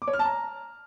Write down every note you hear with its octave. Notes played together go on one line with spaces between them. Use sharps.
D6
C#5
F6
A5
A#5